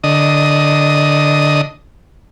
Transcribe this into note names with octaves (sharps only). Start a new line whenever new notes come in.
D3 D#5